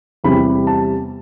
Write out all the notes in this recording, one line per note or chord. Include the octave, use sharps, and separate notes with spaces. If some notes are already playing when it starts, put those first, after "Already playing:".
E2 C3 G3 B5
A5